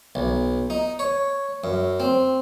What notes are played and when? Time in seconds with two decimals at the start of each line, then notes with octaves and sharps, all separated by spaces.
0.15 B1
0.70 D#4
0.99 C#5
1.64 F#2
2.00 C4